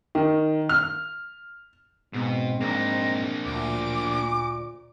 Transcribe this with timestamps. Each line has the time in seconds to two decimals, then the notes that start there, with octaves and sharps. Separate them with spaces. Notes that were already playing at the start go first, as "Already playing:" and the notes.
0.15 D#3
0.69 F6
2.13 G#2 B2 C4
2.61 G#2 A#3 D4 A#5
3.46 D2 A#2 D6